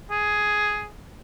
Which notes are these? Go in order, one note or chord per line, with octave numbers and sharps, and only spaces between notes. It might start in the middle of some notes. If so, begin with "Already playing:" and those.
G#4